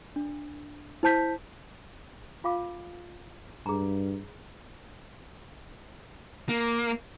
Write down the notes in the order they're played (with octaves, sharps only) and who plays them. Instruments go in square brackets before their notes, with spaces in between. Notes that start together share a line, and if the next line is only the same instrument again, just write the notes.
[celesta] D4
E4 C5 A5 G6 B6
[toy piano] F4 F5 D6
[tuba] G2 [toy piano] G#4 A#5
[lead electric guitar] A#3